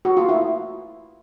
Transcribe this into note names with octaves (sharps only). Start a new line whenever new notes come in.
F#4
F4
E4